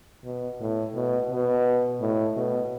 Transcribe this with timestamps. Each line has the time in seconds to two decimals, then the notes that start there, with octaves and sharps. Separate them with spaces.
0.24 B2
0.60 A2
0.95 B2
1.30 B2
2.01 A2
2.36 B2